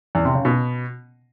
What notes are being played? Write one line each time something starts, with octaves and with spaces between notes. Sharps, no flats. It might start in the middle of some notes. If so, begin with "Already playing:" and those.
E2
C3
C#3
B2